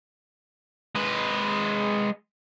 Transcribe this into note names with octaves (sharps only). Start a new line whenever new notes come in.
G#3 B4